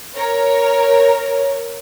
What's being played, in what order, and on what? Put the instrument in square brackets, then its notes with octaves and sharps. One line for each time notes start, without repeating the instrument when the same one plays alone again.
[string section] A#4 C#5